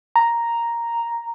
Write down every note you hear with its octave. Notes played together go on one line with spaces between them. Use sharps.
A#5